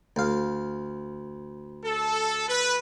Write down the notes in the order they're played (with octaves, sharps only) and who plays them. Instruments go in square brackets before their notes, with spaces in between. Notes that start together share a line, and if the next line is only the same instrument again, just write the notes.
[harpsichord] D2 F5
[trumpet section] A4
B4